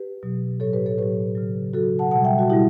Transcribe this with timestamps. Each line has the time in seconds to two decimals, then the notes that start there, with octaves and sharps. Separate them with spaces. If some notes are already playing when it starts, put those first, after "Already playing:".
Already playing: G4 B4
0.23 B2 F#3
0.60 A2 F#3 A4 C#5
0.73 G4 B4
0.86 A4 C#5
0.98 A2 F#3 G4 B4
1.35 C#3 F#3
1.73 C#3 F#3 F#4 A4
1.99 F#5 A5
2.11 B2 G3 F#5 A5
2.24 E5 G5
2.39 F#4
2.50 B2 G3 E4 G4